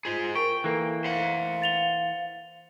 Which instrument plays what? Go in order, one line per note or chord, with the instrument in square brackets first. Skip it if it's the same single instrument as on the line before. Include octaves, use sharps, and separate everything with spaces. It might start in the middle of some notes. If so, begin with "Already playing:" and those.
[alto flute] F4 [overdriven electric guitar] G#4 C5
[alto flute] A#4 [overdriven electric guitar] G5 [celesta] C#6
[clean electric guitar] E3 A#3 [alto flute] A4
[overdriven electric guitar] C5 F#5 [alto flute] F5
[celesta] A6 F7 G7